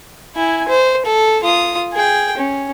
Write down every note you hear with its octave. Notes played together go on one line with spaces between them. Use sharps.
E4 G#5
C5
A4
F4 D#6
G#4 G5
C#4